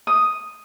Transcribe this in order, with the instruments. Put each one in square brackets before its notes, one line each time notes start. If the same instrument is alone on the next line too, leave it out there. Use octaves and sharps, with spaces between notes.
[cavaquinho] D#6